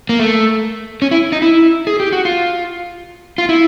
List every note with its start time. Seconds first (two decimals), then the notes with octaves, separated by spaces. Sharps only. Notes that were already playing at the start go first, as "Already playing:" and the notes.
0.09 A#3
0.19 A3
1.02 C#4
1.11 E4
1.32 D#4
1.42 E4
1.87 G#4
2.00 G4
2.12 F#4
2.25 F4
3.38 F4
3.49 E4